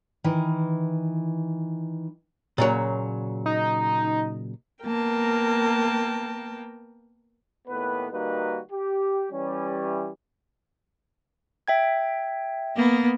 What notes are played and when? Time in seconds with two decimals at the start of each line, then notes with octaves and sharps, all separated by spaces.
0.24 D#3 E3
2.58 A#2 C#3 F#3
3.46 D#4
4.85 A#3 B3 A#4 G5 A5
7.68 D#2 A2 B3 B4
8.12 D#3 G3 A#3 D#4 F#4 B4
8.71 G4
9.30 E3 G3 C#4
11.68 E5 G5 G#6
12.76 A#3 B3